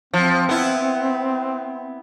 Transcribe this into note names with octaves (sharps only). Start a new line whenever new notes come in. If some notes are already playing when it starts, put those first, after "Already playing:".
F3 C4
B3 E4